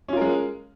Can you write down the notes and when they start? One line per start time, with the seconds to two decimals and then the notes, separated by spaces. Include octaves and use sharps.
0.08 C#4
0.13 F4
0.17 A#4
0.21 G#3